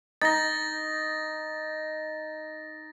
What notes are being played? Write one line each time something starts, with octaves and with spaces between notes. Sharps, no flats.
D#4 A6 A#6